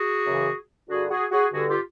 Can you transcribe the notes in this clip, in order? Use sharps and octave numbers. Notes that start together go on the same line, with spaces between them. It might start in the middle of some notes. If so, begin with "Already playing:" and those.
Already playing: F#4 G#4
F#2 C#3 E3
G2 D3 F#4 G#4
F#4 G#4
F#4 G#4
G2 D3 F#4 G#4
F4 G4